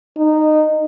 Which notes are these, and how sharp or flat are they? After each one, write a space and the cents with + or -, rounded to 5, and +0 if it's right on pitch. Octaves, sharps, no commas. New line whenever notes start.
D#4 -15